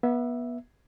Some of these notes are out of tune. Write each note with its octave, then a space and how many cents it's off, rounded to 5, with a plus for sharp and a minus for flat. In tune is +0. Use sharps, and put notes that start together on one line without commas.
B3 -25 E5 +0